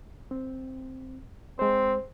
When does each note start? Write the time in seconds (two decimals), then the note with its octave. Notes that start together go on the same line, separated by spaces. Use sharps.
0.31 C4
1.59 G#3 C4 C5